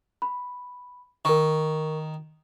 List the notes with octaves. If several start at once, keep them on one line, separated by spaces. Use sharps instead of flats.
B5
D#3 A#4 C#6